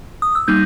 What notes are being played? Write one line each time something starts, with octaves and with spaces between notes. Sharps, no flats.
D#6
E6
G3 A#3 D#4 G6